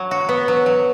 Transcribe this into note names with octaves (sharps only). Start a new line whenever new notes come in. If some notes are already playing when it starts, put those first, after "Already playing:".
Already playing: F#3
F#4
B3
F#3
F#3